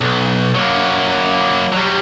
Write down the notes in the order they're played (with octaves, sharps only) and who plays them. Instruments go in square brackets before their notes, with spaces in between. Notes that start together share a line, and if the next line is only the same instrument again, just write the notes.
[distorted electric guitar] B1
F#3 A#3
F#3 G3